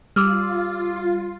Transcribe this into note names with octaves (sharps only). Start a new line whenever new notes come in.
G3 F4 D6 E6 F6